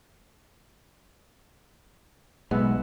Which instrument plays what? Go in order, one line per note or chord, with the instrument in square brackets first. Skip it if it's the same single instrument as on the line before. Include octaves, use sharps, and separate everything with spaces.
[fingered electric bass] B1 G#3 [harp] B3 E5